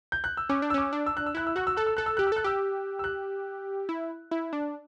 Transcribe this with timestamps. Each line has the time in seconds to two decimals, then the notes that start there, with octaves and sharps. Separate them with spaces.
0.12 G6
0.24 F#6
0.37 E6
0.49 C#4 D6
0.62 D4
0.70 E6
0.74 C#4 D6
0.93 D4
1.06 E6
1.17 F#6
1.26 E6
1.35 E4 F#6
1.47 E6
1.56 F#4 F#6
1.67 E6
1.77 A4 F#6
1.87 E6
1.97 A4 F#6
2.06 E6
2.17 G4 F#6
2.27 E6
2.32 A4 F#6
2.44 G4 E6
2.99 E6
3.04 F#6
3.89 E4
4.31 E4
4.53 D4